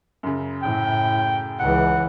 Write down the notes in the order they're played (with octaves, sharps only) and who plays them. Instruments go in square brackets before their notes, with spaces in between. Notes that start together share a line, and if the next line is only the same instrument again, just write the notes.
[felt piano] F#2 C#3
[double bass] A2 [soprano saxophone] G5
[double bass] C#2 E3 [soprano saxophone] F#5